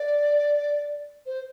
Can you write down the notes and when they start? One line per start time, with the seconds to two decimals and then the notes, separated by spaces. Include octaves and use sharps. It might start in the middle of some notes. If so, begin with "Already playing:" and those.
Already playing: D5
1.26 C5